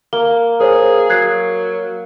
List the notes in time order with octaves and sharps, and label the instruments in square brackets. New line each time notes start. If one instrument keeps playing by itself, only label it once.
[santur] A#3 [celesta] G7
[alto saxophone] G#4 [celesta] A#4 C5 C#5
[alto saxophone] F#3 [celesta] F#6 G#6 C7